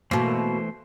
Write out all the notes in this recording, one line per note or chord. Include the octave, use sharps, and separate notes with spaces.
B2 E3 A3 A#3 C5